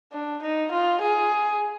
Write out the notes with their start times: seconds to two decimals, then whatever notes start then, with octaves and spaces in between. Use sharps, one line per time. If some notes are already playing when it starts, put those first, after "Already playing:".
0.12 D4
0.42 D#4
0.71 F4
1.01 G#4